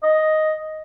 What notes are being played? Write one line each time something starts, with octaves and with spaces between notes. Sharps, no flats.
D#5